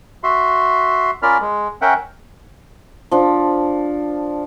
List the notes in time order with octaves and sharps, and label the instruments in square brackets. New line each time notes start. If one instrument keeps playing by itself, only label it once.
[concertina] F#4 E5 C6
C#4 F4 A#4 D5 B5 F6
G#3
C#4 A#4 E5 F#5 G5
[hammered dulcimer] F3 D4